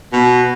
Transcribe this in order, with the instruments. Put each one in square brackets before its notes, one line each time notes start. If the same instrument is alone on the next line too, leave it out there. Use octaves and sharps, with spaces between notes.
[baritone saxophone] B2